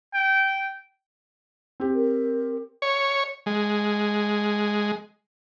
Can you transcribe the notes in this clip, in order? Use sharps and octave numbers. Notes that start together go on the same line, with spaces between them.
G5
C4 G4
A#4
C#5
G#3